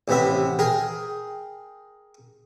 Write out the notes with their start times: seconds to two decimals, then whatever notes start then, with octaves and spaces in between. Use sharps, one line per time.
0.08 A1 C3 B3 E5
0.59 G#4 A#4 G5